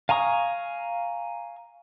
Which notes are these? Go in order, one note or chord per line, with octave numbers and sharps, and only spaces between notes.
F5 G#5 A#5 C#6 D#6